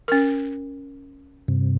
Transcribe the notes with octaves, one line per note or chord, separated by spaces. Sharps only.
C#4 A#4
G2 C3